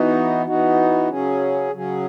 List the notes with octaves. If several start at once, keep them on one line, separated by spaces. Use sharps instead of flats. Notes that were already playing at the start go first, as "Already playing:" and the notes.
Already playing: E3 B3 D#4 F#4
E3 B3 D#4 F#4
C#3 F#3 C#4 G#4
C#3 F#3 C#4 G#4